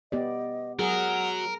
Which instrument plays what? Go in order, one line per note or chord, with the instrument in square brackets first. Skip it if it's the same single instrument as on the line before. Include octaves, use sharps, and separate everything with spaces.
[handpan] B3 G4 D5 [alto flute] D#5
[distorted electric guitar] F#3 [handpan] G#4 [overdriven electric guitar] A#4 [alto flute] F#5